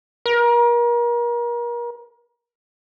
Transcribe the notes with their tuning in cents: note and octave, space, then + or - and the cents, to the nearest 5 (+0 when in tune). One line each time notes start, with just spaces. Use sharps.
A#4 +35